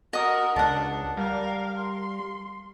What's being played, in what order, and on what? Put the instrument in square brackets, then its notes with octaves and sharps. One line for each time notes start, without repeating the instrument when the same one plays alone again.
[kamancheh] F#4 A#4 [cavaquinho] D#5 D#6
[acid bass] C#2 [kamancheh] D4 [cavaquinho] A4 F#5
[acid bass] G3 [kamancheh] A#4 F5
[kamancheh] C6